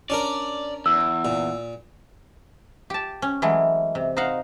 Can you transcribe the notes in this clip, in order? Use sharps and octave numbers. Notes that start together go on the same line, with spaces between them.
C#4 D4 A#4 D5
E2 E6
A#2
G4 A5
C#4
E3 F#3 G#3 A3
C3
D#4 C5 F5 F#5 A#5